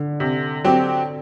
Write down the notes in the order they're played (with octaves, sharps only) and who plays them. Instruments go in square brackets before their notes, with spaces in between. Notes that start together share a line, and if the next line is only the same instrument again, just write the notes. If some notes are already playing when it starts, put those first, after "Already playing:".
Already playing: [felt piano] D3
[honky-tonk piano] C3
F#3 C4 G4